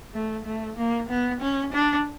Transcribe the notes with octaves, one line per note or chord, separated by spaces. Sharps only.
A3
A3
A#3
B3
C#4
D4